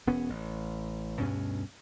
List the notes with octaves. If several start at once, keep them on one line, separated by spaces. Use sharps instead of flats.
E1 B3 C#4
A1
D2 G2 B2 C#4